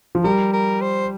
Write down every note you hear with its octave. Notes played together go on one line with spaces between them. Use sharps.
F3
G3 A#4
A#4
C5